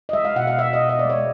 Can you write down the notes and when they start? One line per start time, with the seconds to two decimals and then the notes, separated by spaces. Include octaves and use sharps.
0.09 D#5
0.13 G#3 E5
0.25 F5
0.36 B2 F#5
0.47 F5
0.58 B2 E5
0.73 D#5
0.82 B2
0.89 D#5
0.99 D5
1.05 G#3
1.10 C#5